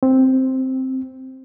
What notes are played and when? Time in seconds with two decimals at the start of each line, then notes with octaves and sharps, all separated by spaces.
0.03 C4